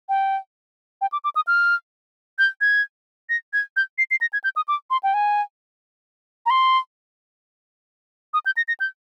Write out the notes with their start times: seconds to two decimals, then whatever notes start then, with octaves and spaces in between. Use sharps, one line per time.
0.09 G5
1.01 G5
1.12 D6
1.24 D6
1.35 D#6
1.47 F6
2.38 G6
2.61 G#6
3.29 A#6
3.53 G#6
3.76 G6
3.98 C7
4.11 C7
4.21 A#6
4.33 G#6
4.44 G6
4.56 D#6
4.68 D6
4.90 C6
5.03 G5
5.14 G#5
6.46 A#5
6.50 C6
8.34 D#6
8.46 G6
8.57 A#6
8.68 A#6
8.80 G6